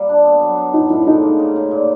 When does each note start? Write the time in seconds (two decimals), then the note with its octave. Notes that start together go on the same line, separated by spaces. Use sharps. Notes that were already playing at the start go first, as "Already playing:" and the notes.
Already playing: A#2 G3 A#3
0.09 D4
0.25 B3
0.42 F#3
0.57 B3
0.74 F3 D#4
0.90 A2 E4
1.06 G#3 D#4
1.23 A#3
1.39 C#3
1.56 C#3
1.71 A#2